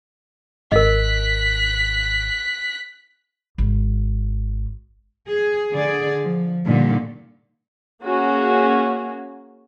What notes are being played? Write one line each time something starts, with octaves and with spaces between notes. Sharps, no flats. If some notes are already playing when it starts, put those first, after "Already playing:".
G#1 A#4 D#5 F#6 B6
G#1
G#4
D3 G#4 D5
F3
A#2 D3 D#3 G3
A#3 C#4 F#4 G#4